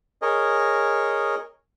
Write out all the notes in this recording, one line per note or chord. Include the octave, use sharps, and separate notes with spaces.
G#4 A#4 C#5 D#5